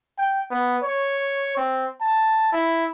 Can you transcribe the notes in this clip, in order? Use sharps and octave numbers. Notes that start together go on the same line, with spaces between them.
G5
B3
C#5
C4
A5
E4